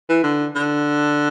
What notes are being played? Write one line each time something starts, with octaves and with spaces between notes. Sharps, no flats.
E3
D3
D3